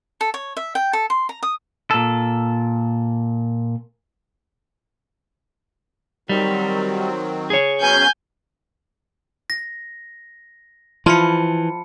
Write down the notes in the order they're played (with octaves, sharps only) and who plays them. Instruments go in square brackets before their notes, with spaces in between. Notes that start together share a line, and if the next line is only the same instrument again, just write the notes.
[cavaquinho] A4
C#5
E5
G5
A4
C6
A#5
D#6
[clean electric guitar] A#2 A4
[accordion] D#3 F#3 C4 [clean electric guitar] G3
[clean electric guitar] G#4 C#5
[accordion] F#3 B3 C#4 [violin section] G#5 G6
[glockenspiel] A#6
[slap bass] E3 [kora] F3 E4 F4 [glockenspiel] A5 B5 C#7